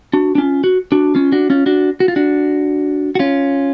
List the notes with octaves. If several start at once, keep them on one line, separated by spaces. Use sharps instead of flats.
D4 F#4
D4
C#4 F4
F#4
D4 F#4
C#4 F4
D4 F#4
C#4 F4
D4 F#4
F#4
F4
D4 F#4
F#4
C#4 F4